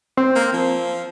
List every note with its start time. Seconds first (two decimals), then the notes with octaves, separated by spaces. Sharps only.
0.17 C4
0.35 A#3
0.53 F3